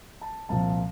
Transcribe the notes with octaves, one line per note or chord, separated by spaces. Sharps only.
A5
C2 A#2 F3 A5